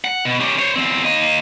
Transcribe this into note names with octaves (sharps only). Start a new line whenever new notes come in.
F#5
B2
C#4 G4
C5 C#5
E2 C4
A#3 D#5